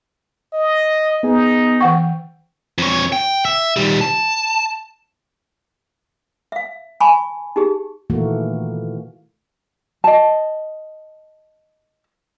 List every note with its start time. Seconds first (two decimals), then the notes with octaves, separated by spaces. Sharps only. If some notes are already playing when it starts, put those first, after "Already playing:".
0.54 D#5
1.23 B3 D#4 G#4
1.81 E3 F#5 G5 C#6
2.78 F2 C#5
3.12 G5
3.45 E5
3.76 D#3 G3
4.01 A5
6.52 E5 F5
7.00 G#5 A5 B5 C#6
7.56 D#4 G4 G#4
8.10 A#2 D#3 E3 A3 A#3 F#4
10.04 D#5 A5